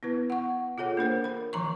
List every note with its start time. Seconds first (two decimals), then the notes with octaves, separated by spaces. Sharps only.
0.03 B3 E4 B4
0.30 F#5 C#6
0.78 F4 G#4 A4 C#5 F#5
0.97 A#3 D4 A#4 C5
1.24 A#4 B5
1.53 D#3 F3 A#5 C#6